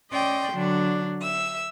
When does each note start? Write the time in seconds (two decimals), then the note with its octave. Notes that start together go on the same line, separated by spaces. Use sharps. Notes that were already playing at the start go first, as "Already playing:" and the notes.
0.12 C#4 D5 D#5 G5 C6
0.52 D3 F#3 D4
1.21 E5 E6